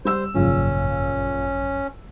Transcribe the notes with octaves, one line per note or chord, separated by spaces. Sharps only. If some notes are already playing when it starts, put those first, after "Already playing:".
G3 C5 E6
G#1 F#2 A#2 C#3 F3 C#4